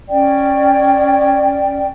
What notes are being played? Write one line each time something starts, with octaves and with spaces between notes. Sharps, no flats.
C#4 D5 G5